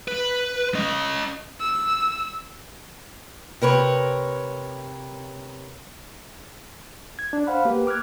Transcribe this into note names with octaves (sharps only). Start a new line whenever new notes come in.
B4
C#4 D#5
E6
C3 A#4 B4 C#5
G#6
D4
C5 F5 F#5 B5
A#3 G4 B4
D6 F6 F#6 G#6